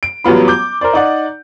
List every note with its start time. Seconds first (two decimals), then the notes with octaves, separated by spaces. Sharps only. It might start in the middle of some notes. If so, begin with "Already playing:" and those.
0.03 D7
0.24 A1 F#3 G3 B3 F4 B5
0.48 D6 G6
0.81 A#4 C5 D5
0.93 D#4 D5 F#5